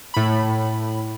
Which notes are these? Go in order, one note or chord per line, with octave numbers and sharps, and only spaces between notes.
A2 B5